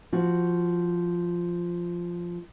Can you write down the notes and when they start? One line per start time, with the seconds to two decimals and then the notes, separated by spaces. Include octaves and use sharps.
0.12 F3 F#4